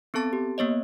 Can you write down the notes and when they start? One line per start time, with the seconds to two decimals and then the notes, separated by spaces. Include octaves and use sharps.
0.14 B3 C4 A4 A5 A6
0.33 G4
0.58 A#3 B3 C#5 D#5